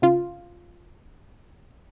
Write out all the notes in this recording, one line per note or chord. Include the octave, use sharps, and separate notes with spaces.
C#3 F4